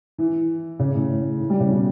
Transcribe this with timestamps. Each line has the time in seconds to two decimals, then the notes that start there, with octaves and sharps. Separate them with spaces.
0.18 E3
0.79 C#3
0.95 A2
1.10 A2
1.40 E3
1.50 G3
1.60 C#3
1.70 B2